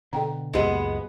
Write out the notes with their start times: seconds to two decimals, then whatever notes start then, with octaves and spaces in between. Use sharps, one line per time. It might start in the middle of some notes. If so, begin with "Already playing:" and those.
0.13 B2 D3 A4 G5 A#5
0.54 C#2 F#2 A#2 G#3 B3 D#4 G4 D#5